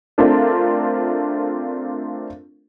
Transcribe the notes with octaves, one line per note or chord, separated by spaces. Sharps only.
A3 C4 D4 F4 A#4